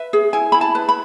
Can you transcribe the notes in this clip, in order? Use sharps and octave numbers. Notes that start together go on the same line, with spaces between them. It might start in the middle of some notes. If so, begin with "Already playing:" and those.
Already playing: B4 E5
G#4
E4 G#5
E4 B5
A5
B4
B5